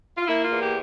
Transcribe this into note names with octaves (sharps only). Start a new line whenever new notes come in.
F4
A#3 E4
F4
E2
G4